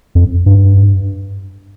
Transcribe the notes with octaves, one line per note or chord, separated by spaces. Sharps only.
F2
G2